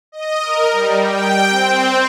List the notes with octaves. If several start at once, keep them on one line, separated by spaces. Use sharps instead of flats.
D#5
A#4
G3
G5
C4